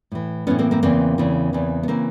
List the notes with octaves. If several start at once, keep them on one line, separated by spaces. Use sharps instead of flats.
A2 E3
A2 E3 B3 C#4
A#3 C4
A#3 C4
E2 C#3 E3 A#3 C4
E2 C#3 E3
E2 C#3 E3
B3
C#3 E3 A#3 C4